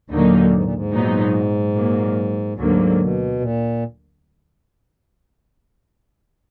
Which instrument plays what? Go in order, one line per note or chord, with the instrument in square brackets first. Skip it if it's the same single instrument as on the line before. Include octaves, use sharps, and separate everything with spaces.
[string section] D#2 D3 F#3 A#3 D#4 [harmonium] A#2
[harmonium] G#2
A#2
G#2
[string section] A#2 F#3 B3 D#4
A#2 F#3 A#3
[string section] D2 D3 F#3 A#3 [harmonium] G#2
[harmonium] B2
A#2